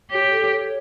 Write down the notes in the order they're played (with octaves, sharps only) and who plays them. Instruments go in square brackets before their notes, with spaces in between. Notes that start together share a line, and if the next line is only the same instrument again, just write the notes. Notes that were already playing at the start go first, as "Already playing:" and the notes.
[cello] G4 [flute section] C#5
[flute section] A4
C#5